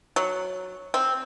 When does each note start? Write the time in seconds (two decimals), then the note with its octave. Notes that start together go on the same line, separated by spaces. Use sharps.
0.16 F#3
0.94 C4